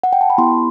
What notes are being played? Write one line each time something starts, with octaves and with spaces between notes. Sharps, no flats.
F#5
G5
A5
B5
B3 E4 G4 C6